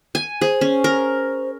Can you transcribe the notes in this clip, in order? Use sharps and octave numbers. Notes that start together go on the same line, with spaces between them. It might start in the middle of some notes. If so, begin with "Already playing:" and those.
G#5
G#4 C5
C#4
A#4